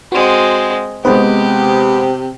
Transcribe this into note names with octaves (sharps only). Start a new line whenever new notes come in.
G#3 C4 F#4
C3 G#3 B3 G4 C5